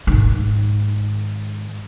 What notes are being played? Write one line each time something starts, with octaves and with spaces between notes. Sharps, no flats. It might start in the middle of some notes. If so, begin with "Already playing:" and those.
G#2 D#3